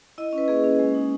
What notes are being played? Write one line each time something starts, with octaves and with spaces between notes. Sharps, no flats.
E4 D#5
C#4
B4
A#3 G#4
C#4
G#3
D#4